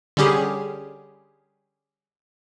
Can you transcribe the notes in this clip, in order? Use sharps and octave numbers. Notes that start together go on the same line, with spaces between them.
D3 G3 C#4 G4 G#4